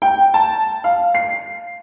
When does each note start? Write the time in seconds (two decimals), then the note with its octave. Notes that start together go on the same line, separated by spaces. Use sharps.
0.02 G5
0.34 A5
0.84 F5
1.15 C7